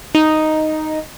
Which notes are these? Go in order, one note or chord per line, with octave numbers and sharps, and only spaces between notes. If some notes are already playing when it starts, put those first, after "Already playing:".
D#4